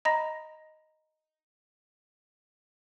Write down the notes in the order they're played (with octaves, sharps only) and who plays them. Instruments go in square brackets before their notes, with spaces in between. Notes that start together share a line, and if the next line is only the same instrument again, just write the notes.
[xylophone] D#5 A#5 B5 A#6